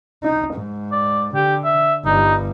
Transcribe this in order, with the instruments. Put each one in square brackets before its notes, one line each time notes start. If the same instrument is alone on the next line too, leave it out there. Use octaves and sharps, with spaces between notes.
[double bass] D#4
G#2
[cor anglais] D5
[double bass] D3 [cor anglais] G4
[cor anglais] E5
[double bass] G1 G3 [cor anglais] D#4